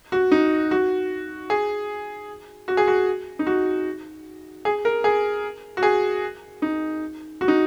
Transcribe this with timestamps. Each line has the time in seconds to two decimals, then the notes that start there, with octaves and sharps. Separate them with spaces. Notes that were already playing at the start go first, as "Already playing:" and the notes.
0.12 F#4
0.32 D#4
0.71 F#4
1.50 G#4
2.68 F#4
2.77 G#4
2.88 F#4
3.39 D#4
3.47 F#4
4.65 G#4
4.85 A#4
5.04 G#4
5.77 F#4
5.83 G#4
6.62 D#4
7.41 F#4
7.48 D#4